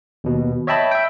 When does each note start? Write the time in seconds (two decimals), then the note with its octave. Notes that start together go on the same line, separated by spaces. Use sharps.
0.24 D#2 B2
0.67 C#5 D#5 E5 G5 A5 B5
0.91 E5 G5